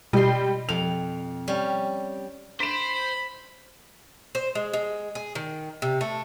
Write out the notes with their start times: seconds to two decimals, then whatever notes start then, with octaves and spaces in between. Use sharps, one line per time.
0.13 B2 G3 D#5 C6
0.69 F2 F7
1.48 G3 C#4
2.60 C5 B5 B6 D7 E7
4.35 C5
4.55 G#3
4.73 G#3
5.15 G#4
5.35 D#3
5.82 C3
6.01 A3